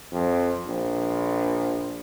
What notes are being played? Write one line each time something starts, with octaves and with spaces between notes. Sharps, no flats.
F2
A#1